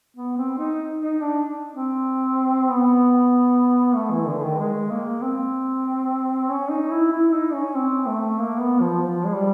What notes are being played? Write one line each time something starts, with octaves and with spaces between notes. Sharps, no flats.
B3
C4
D#4
D#4
D4
C4
B3
A3
E3
D3
D#3
G#3
A#3
C4
C#4
D#4
E4
E4
D#4
C#4
C4
A3
A#3
B3
F3
F3
G#3
G3